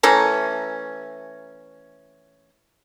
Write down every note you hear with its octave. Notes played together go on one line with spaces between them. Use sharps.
E3 A3 C#4 A#5